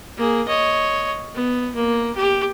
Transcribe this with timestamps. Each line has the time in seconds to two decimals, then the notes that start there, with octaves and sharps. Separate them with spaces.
0.17 A#3 G#4
0.48 C#5 D#5
1.34 B3
1.75 A#3
2.16 G4